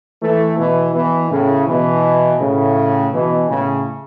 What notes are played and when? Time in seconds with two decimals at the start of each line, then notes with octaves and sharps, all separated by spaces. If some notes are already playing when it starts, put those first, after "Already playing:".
0.21 E3 A3
0.57 B2 E3
0.93 B2 E3
1.30 A2 C#3
1.66 B2 E3
2.39 A2 C#3
3.12 B2 E3
3.48 A2 C#3